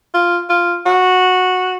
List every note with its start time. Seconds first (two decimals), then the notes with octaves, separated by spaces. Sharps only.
0.14 F4
0.50 F4
0.86 F#4